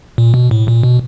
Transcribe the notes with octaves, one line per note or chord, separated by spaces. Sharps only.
A#2
B2
A2
A#2
B2